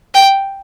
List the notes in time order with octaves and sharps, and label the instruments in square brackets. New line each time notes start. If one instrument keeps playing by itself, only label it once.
[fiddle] G5